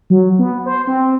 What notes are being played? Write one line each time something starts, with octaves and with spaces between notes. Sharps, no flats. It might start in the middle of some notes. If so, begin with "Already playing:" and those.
F#3
B3
C5
C4